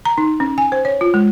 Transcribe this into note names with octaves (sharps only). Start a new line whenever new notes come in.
A#5
D#4
C#4
G#5
C5
C#5
F4
G#3